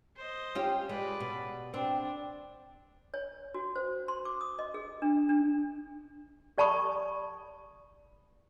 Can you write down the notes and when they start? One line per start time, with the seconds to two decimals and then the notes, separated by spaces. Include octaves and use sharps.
0.17 C5 D#5
0.55 C#4 F4 G4
0.89 G#3 B4 D5
1.20 B2
1.74 C4 D4
3.14 C#5
3.54 F#4
3.76 C5
4.08 C6
4.25 D6
4.41 D#6
4.59 D#5
4.74 G#4
5.02 D4
5.29 D4
6.58 G4 D5 A5 B5 C#6 D#6